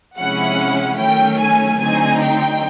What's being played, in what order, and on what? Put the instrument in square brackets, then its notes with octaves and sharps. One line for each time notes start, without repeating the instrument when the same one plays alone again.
[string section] C3 F3 G#3 C#4 E4 F#5
D#3 F#3 A3 C#4 G5
G#5
D3 F#3 A3 C4 D#4 G#5
G5